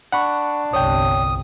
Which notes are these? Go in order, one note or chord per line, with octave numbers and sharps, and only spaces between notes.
D4 F#5 B5 C#6
G1 C2 C#5 G5 D#6